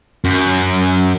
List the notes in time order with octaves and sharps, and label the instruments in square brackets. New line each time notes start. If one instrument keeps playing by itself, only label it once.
[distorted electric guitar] F#2